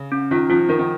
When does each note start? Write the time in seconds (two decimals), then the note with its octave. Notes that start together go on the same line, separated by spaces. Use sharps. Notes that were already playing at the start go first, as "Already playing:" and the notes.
Already playing: C#3
0.12 C#4
0.31 D#3 F4
0.49 F3 F4
0.69 D#3 A#4
0.79 D#3